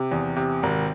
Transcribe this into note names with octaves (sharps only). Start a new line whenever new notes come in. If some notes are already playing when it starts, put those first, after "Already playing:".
Already playing: C3
E2
C3
G#1